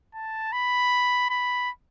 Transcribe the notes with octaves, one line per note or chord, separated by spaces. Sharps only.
A5
B5
B5